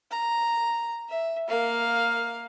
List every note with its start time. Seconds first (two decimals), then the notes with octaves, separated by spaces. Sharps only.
0.11 A#5
1.09 E5
1.48 A#3 F5